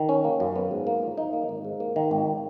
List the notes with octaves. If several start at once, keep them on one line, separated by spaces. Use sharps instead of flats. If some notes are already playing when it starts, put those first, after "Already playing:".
Already playing: D#3
C#4
A#3
F#2
B3
G#2
A#3
F4
D#4
A#3
G#1
G#2
A#3
D#3
G#1